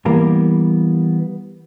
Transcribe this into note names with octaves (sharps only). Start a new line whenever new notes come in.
E3 G3 A#3 B3